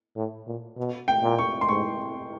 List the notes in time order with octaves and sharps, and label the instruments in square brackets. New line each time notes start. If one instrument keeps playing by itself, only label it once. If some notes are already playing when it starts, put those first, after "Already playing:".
[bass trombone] A2
A#2
B2
[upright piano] G5
[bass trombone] A#2
[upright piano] C#6
C6
[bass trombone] G#2 [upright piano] C#6